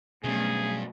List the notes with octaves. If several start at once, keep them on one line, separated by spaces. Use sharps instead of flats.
E2 G2 B2 F#3 A3 B3 C#4 G#4